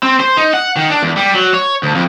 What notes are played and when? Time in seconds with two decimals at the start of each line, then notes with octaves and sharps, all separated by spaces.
0.03 C4
0.20 C5
0.37 D#4
0.54 F#5
0.76 D#3
0.90 D4
1.03 E2
1.17 G3
1.34 F#3
1.54 C#5
1.83 D2
1.95 F2